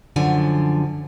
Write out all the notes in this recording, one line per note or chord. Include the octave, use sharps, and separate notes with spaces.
F#2 D3 F3 G#5